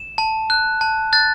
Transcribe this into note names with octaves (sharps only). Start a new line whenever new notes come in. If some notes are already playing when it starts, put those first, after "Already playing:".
Already playing: E7
A5
F#6
A5
F#6 A6